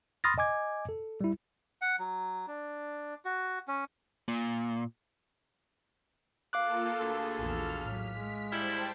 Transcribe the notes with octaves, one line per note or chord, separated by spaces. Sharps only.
B5 C6 D#6 F6 A6 A#6
D#5 G#5 D6 G#6
A4
G3 E4
F#5
F#3
D4
F#4
C#4
A#2
A#3 F4 A4 F5 D6 F#6
D2 G#4 A4
A#1 E2 F6
A2 F#3 B6
G#3
G3 E4 C5 G5 A5